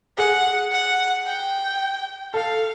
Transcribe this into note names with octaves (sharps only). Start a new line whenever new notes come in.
G#4 F#5
F#5
G5
A4 F5